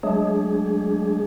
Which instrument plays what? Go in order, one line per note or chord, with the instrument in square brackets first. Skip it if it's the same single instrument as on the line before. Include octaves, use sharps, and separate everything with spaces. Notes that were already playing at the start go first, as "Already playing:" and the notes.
[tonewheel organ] F#3 G#3 A3 D4 G#4